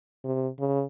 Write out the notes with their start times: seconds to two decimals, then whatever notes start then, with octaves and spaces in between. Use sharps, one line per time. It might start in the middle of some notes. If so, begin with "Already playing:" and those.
0.25 C3
0.59 C#3